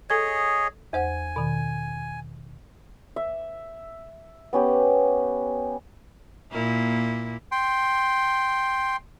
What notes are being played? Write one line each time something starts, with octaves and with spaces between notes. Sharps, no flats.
G#4 A4 C#5 D#5 G#5 G#6
E2 C5 F#5 G#5
B2 D#3
E5
B3 C#4 G4
A#2 A#3 E4
G5 C6